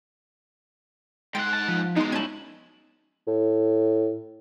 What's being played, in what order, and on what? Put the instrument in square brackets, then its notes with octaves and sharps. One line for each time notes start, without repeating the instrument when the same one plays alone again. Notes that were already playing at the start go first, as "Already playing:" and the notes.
[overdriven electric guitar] G#2 F#5 [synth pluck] G5 A6 D7 [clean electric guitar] C6
[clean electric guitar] A5
F3
[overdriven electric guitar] B2 G#3 [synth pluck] D#4 C6
[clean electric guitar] C#4 D#4 E4 [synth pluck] A5 G#6
[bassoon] A2